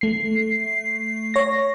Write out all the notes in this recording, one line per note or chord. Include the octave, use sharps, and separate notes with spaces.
A3 C7
C#5 A#6